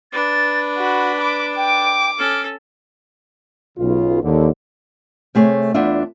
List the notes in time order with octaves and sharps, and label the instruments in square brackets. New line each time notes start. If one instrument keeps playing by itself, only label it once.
[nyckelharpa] D4 B4 [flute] A6
[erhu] F#4 [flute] B5
[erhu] D6
[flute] G5 [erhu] D6
[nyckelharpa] C#4 A4 [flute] F6
[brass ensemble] B1 C#3 F4
D#2 D3
[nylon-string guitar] C3 A3 G#4 C#5
E2 B3 D4 F4 E5